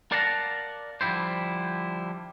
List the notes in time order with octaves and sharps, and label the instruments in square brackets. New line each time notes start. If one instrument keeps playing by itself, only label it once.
[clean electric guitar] A#4 D5 F5 F#5 A5 A#5
D3 F3 G3 E4 C5